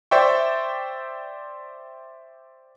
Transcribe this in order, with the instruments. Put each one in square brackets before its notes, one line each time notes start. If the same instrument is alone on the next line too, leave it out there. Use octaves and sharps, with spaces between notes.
[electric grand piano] C5 D5 E5 G5 C#6